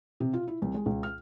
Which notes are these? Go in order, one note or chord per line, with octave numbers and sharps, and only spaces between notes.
C3
F4
E4
C2
G#3
C#2
F6